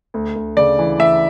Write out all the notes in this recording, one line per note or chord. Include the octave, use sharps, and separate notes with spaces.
D2
D2
C#3 D5
E3
E3 E5